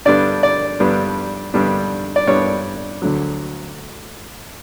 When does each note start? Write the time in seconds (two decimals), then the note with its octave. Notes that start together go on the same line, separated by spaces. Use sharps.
0.05 G2 D3 G3 B3 D4 D5
0.43 D5
0.80 G2 D3 G3 B3 D4
1.54 G2 D3 G3 B3 D4
2.16 D5
2.27 G2 D3 G3 B3 D4 C#5
3.02 D2 D3 F#3